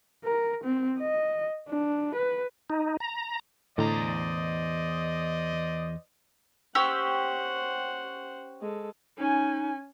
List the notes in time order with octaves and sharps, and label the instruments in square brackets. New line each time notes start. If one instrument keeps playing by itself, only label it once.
[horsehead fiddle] A#4
C4
D#5
D4
B4
[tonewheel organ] D#4
A#5
[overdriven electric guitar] E2 A#5 [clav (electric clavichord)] A2 D3 [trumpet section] C5 D5 D#5
[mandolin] C#4 G4 E6 [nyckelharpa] C5 F#5
[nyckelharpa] G#3 A4
[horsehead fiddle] C#4 G#5 [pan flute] D#4